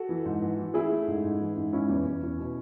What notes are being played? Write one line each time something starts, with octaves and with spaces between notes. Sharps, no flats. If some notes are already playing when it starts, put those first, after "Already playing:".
Already playing: F#4 A4
E3
G#2
E3
E3
A3 E4 G#4
A3
G#2
G#2
E3
G#2
G#3 C#4 E4
E2
E2
E2
B2